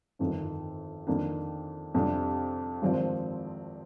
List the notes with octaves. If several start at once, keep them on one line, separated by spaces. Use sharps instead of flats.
G1 F2 D#3
F2 D#3 A#3 D4
F2 C3 G3 D4
G#1 G2 F3 C4